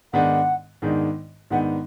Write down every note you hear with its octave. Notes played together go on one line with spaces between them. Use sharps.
G#2 D#3 G#3 B3 D4 F#5
G#2 D#3 G#3 B3 D4
G#2 D#3 G#3 B3 D4 F#5